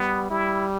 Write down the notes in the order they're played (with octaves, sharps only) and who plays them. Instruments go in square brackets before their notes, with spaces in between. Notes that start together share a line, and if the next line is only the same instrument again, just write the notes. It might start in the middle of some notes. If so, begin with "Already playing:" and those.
Already playing: [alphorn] G3 [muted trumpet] B3
[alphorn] G3 [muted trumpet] E4